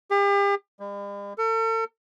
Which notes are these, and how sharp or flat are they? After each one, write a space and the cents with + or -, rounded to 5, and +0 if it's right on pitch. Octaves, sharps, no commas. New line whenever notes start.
G4 +40
G3 +45
A4 +40